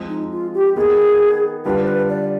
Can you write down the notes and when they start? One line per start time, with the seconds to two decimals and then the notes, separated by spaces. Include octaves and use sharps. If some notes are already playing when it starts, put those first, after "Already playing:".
Already playing: F3 G#3 C4
0.09 D#4
0.31 F4
0.54 G4
0.76 D#3 B3 D#4 G#4
1.65 D3 G3 D4 F4 B4
1.83 C5
1.87 B4
2.09 D5